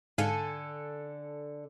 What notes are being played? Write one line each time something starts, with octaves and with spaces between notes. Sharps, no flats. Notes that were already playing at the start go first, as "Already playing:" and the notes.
G#2 D3 A4 F5 G#5 D#7